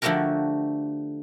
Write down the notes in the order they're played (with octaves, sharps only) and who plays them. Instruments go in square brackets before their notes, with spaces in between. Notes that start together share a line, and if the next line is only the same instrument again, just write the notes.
[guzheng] D3 F3 A3 F#4 G4 A#4